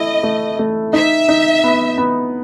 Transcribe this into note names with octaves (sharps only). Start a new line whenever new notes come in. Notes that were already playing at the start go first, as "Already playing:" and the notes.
Already playing: A3 E4 D#5
A3
A3
D#4 E5
D#4
B3
B3